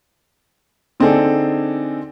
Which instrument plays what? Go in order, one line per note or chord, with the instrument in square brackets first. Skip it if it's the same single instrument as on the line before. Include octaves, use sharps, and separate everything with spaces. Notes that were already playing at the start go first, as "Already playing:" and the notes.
[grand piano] D3 C4 D#4 G#4 A4 D5